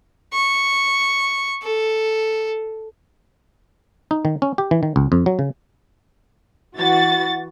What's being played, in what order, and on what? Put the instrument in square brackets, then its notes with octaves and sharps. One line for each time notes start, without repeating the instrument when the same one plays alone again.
[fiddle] C#6
A4
[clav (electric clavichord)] D#4
D#3
C#4
G4
E3
D#3
C#2
F2
F#3
C#3
[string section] E3 F#4 A6